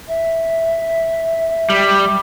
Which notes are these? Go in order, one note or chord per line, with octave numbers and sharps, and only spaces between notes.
E5
G3